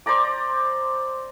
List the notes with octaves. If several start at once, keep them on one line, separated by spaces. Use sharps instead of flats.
C5 D5 A#5 D6